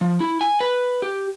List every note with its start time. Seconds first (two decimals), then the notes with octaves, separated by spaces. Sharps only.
0.01 F3
0.20 E4
0.41 G#5
0.60 B4
1.02 G4